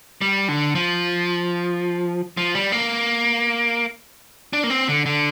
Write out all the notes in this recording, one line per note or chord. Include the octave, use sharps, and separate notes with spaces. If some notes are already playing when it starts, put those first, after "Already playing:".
G3
D3
F3
F3
G3
A#3
D4
A#3
C4
D3
D3